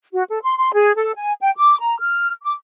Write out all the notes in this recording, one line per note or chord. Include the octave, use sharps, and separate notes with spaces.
F#4
A4
C6
C6
G#4
A4
G#5
G5
D6
A#5
F6
D6